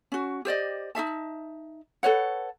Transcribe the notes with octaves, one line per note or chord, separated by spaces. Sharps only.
C#4 F#4
G4 C5 D5 D#5
D#4 G#4 E5 A5
A4 B4 C#5 F#5